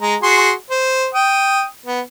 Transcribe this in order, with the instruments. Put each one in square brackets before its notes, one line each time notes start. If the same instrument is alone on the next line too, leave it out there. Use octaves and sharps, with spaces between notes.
[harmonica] G#3 A#5
F#4 G#4 C6
C5
G5 D#6
B3